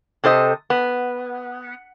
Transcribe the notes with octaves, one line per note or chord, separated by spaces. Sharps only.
C3 A4 C5 D#5
B3